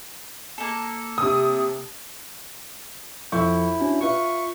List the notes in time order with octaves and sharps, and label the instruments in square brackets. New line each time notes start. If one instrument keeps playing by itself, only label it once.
[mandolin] A#3 A4
[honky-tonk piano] C3 D#6
[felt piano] F2 C#6 G6 [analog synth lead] E4
[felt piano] C#4 D4 F#4
[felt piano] F4 B4 E5 [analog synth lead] C#6